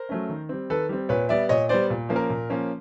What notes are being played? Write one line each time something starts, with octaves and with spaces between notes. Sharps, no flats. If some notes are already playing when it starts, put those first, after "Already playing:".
Already playing: A#4 C5
F#3 A3 C#4
D#3
G3 C4
D#3 A4 B4
G3 C4
A#2 B4 C#5
G3 B3 D5 E5
A#2 C#5 D#5
G3 B3 C5 D5
A#2
F3 A#3 C#4
A#4
A#2
F3 A#3 C#4